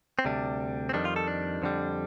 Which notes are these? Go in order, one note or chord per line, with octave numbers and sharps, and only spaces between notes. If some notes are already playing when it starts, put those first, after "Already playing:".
C4
D2 C3 G3 D4
C4
F2 D#3 G3 D4
F4
A4
D4
F2 D3 G3